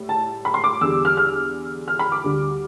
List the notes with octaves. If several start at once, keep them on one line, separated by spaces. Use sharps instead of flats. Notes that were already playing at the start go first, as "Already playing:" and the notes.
Already playing: A2 G3
A5
B5
C6
D6
E2 D3 G3 E6
F6
F6
F6
B5
D6
D2 D3 G3